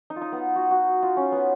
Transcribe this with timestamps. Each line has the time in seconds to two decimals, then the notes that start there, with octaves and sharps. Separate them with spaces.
0.10 D#4
0.16 F4
0.21 D#4
0.32 B3
0.56 F#4
0.71 F#4
1.03 F4
1.17 C#4
1.32 B3